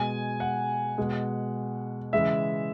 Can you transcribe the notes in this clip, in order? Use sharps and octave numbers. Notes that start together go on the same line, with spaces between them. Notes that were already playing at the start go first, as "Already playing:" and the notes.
Already playing: B2 G#3 G#5
F#5
B2 G#3
C#3 E3 G#3 E5